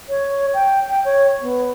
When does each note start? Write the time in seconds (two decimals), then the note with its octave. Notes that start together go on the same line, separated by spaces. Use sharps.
0.09 C#5
0.54 G5
0.89 G5
1.05 C#5
1.41 B3